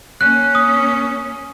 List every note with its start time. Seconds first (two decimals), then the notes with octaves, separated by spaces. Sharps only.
0.21 A#3 C#4 F#6
0.55 D#6